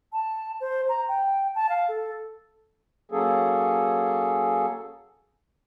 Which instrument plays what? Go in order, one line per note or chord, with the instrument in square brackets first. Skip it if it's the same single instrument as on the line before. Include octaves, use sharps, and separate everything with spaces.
[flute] A5
C5
A#5
G5
A5
F5
A4
[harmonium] F#3 A#3 C#4 G#4 A4